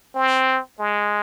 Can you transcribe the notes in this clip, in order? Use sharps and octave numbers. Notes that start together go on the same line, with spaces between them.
C4
G#3